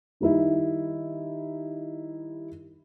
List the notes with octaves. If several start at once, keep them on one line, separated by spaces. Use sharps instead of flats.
D#3 G3 D#4 E4